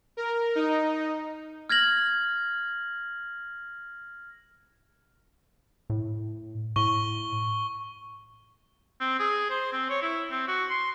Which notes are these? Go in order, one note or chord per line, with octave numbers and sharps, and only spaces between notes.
A#4
D#4
F6 G#6 A#6 F#7
A2
A2 C#6 G7
C4
G#4
C5
C4
C#5
E4
C4
F#4
C6